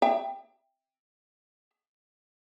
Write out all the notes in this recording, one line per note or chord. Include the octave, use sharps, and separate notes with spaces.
E5 G5